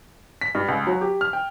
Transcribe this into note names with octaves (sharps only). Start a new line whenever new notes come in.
B6
G2
C#2
F#3
G4
F6
G5